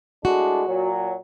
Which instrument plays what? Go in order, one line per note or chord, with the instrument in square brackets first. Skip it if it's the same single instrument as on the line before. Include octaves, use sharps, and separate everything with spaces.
[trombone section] A2 G#3 D4 [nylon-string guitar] F#4
[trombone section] A#2 F#3